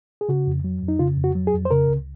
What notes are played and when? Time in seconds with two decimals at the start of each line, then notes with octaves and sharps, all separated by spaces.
0.21 G#4
0.29 C#3 F#4
0.47 F2
0.64 F#3
0.82 F2
0.88 D#4
0.99 C#3 F4
1.17 F2
1.24 F#4
1.35 F#3
1.47 G#4
1.53 F2
1.65 C5
1.71 C#3 A#4
1.89 C#2